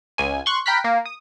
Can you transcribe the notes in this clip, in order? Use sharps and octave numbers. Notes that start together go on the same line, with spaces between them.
C#2 G#5
C6 C#6 F#6
G5 A#5 B5 F6 F#6 B6
A#3
D#6